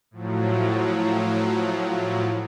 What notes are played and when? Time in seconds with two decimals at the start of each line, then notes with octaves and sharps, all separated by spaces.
0.11 A2 F3 F#3